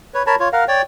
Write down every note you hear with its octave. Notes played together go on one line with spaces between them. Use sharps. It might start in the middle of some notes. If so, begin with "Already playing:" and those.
B4 C#5
A#4 C#5 A5 B5
F4 C#5
A#4 F5 F#5
C#5 D5 G5